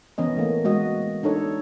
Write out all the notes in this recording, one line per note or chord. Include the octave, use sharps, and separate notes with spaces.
E3 B3 C#4 D#5
A3 A#3
G#3 F#4 D#5
D4 D#4 A4 C#5